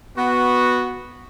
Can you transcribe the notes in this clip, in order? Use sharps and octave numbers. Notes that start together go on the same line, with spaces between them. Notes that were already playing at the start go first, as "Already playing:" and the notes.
B3 F#4